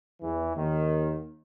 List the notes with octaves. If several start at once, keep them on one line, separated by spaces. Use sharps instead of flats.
E2 E3
D#2 D#3